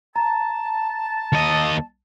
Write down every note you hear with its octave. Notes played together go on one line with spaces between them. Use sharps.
A5 A#5
D#2 D#5